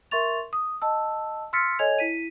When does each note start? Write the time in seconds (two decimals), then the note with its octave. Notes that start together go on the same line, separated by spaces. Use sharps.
0.11 A#4 E5 C6 C#6 A6 F7
0.53 D#6
0.82 D#5 A5 E6
1.53 C6 E6 F6 A6 B6 C#7
1.79 A4 C#5 D#5 G#5 G#6 F7
1.98 E4 B6 D#7